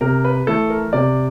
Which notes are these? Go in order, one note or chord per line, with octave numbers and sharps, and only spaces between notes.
C3 A#4
B4
E3 A3 A4
A#4
C3 D5